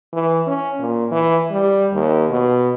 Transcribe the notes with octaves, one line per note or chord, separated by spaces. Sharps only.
E3
C#4
A#2
E3
G3
D#2
B2